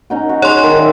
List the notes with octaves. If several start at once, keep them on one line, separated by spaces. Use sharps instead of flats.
C#4 D#4 F#4
F#4
G#4 C#5 C6
D#3
D5 E5